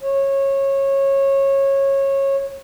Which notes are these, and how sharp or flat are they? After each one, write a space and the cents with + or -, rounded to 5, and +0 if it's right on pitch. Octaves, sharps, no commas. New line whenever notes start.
C#5 -20